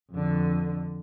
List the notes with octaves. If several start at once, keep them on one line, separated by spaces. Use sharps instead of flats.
F2 D3